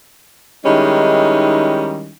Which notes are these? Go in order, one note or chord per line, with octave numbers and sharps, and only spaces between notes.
D#3 G3 G#3 C#4 D#4 E4